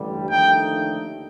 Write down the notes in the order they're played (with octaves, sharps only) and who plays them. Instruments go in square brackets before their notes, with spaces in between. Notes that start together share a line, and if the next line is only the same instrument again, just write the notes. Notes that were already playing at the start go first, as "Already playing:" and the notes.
Already playing: [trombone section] A1 G2 D3 G3
[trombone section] D#2 D3 F3 A3 D#4 [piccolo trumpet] G5